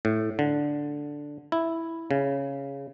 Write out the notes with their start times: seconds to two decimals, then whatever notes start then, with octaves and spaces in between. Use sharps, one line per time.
0.05 A2
0.39 D3
1.52 E4
2.11 C#3